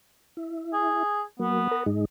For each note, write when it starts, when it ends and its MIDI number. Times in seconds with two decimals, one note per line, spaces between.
0.37 1.03 64
0.73 1.22 68
1.39 1.67 54
1.39 1.67 58
1.39 1.82 59
1.71 1.83 70
1.86 2.05 44
1.86 2.05 56
1.86 2.05 63